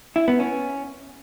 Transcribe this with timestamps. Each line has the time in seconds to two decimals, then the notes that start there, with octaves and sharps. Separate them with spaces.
0.16 E4
0.28 B3
0.40 C#4